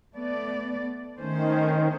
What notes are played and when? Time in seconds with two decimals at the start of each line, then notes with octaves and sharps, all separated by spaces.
0.15 A3 B3 D5
1.20 D#3 A3 C#4 C5